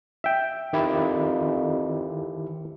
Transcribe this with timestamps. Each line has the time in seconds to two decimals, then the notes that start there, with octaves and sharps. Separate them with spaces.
0.24 E5 G5
0.73 F2 D#3 E4 G4